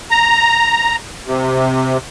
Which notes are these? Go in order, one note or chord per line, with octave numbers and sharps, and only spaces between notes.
A#5
C3